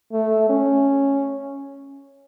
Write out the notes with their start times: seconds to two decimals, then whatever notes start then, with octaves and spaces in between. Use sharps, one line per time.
0.13 A3
0.50 C#4